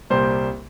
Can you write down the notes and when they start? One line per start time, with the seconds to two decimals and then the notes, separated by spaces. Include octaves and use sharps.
0.10 C2 A#2 G3 C5